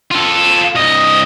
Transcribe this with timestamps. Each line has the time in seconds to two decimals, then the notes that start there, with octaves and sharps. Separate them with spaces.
0.12 F4 A4
0.76 C2 D#5